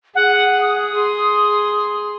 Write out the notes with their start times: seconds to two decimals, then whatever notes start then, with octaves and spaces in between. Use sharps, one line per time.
0.15 G#4 F#5
0.61 D#6
0.95 G#4 C6